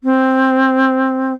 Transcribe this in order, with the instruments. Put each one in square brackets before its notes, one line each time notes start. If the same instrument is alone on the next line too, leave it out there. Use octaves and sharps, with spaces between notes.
[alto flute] C4